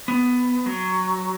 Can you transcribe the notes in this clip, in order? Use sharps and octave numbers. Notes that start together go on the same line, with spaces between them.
B3
F#3